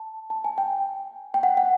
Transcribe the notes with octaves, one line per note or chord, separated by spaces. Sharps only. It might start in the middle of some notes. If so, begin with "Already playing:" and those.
Already playing: A5
A5
G#5
G5
G5
F#5
F#5